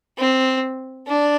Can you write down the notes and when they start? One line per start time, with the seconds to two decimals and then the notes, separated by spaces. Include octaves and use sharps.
0.18 C4
1.07 D4